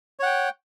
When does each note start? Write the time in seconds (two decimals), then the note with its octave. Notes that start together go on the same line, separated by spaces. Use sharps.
0.20 C#5
0.23 F#5
0.26 G5